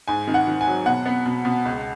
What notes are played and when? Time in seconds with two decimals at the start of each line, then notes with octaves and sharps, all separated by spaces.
0.08 G#2 G#5
0.27 D#3
0.34 F#5
0.47 D#3
0.61 G#5
0.68 F#3
0.86 B2 F#5
1.06 B3
1.26 B2
1.45 B2
1.65 C#2